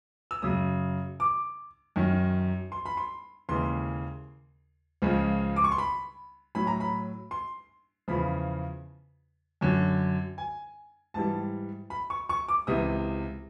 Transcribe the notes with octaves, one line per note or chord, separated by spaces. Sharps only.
E6
F#2 C#3 F#3 D#6
D6
F#2 D#3 F#3
C6
B5
C6
D#2 C#3 E3 G#3 C6
C#2 C#3 F3 G#3
D6
C#6
C6
B5
A2 F#3 B5
A#5
B5
C6
E2 C#3 F3 B5
F#2 D3 F#3
G#5
G#2 E3 G3 A5
B5
C#6
C#6
D6
C#2 C3 E3 D#6